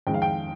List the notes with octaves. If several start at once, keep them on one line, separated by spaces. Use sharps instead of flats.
F2 D#3 G#3 G5
F5
G5